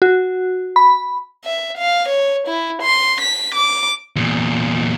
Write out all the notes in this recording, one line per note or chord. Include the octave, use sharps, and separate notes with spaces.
F#4
B5
E5
F5
C#5
E4
C6
B6
D6
E2 A#2